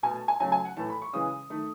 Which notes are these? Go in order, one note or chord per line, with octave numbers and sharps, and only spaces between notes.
B2 A3 G#5
A5
G#5
C#3 F#3 A3 G#5
G#5
F#5
A2 E3 A3 A5
B5
C#6
C#3 E3 G#3 D#6
D#3 A3